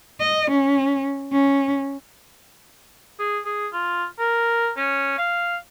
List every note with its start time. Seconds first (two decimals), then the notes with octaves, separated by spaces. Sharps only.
0.20 D#5
0.51 C#4
1.32 C#4
3.19 G#4
3.45 G#4
3.73 F4
4.19 A#4
4.77 C#4
5.18 F5